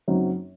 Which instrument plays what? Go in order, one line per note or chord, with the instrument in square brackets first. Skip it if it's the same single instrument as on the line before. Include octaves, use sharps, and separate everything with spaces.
[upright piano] F#1 F#2 F#3 C4 D#4